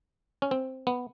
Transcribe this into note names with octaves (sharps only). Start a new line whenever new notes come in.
C#4
C4
B3